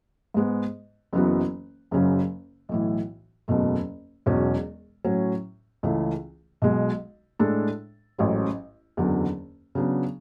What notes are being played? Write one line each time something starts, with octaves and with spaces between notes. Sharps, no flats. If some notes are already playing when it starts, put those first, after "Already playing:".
G#2 G#3 B3
F#1 F#2 E3 B3 F#4
F#1 F#2 C#3 F#3
B1 A2 E3
F#1 E2 B2 A3
E1 E2 B2 F#3 C#4
A2 F#3 C#4
C#2 C#3 E3 A3
B1 B2 G#3
A2 G#3 D4 A4
A1 G#2 F#3 A3 C#4
F#1 E2 D3 F#3
C#3 F#3 B3 D4